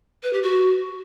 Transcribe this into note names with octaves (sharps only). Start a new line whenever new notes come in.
B4
G4
F#4